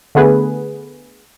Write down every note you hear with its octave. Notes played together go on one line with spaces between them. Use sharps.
D3 A3 B3 G#4 B4